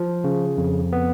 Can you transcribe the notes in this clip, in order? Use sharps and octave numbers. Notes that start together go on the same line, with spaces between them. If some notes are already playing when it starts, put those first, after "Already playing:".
Already playing: F3
C#3
F2
B3